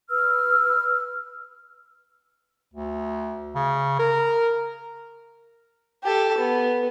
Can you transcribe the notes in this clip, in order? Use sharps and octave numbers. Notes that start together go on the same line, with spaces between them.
B4 E6 F6
D2
C#3
A#4
G4 A4
B3